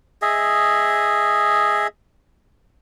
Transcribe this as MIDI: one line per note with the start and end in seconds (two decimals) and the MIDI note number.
0.22 1.87 68
0.22 1.87 75
0.22 1.87 76